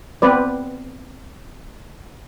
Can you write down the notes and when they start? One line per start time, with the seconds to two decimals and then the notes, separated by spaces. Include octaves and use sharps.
0.22 B3 C4 B4 D5